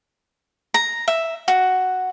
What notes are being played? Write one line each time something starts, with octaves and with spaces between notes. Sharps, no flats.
A#5
E5
F#4